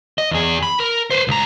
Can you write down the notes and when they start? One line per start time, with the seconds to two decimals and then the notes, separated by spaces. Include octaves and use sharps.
0.18 D#5
0.31 E2 G#4
0.63 B5
0.80 A#4
1.11 B4 C5
1.28 C#2 A#5